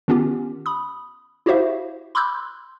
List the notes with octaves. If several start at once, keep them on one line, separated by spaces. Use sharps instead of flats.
D#3 B3 C#4 F4 G4
B5 D#6
E4 F#4 G4 C5 E5 F5
B5 C6 D6 E6 F#6 G6